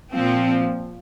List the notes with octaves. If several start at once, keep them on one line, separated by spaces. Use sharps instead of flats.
A#2 F3 C4